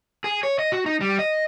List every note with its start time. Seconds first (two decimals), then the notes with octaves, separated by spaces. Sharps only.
0.24 G#4
0.43 C#5
0.59 D#5
0.72 F#4
0.86 D#4
1.01 G3
1.19 D#5